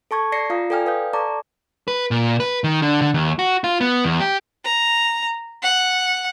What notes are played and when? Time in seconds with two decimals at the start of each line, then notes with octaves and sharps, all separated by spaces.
0.11 A4 A5 C#6 G#6
0.32 D5 A#6 C7 C#7
0.50 F4 F5 A#5 D#6
0.70 A4 D5 G5 G#5 F6
0.86 B4 F5 D#6 G6
1.13 A4 D5 A5 A#5 C#6 D6
1.88 B4
2.11 A#2
2.40 B4
2.64 D#3
2.82 D3
3.02 D3
3.14 D#2
3.39 F#4
3.64 F4
3.81 B3
4.04 E2
4.20 G4
4.64 A#5
5.63 F#5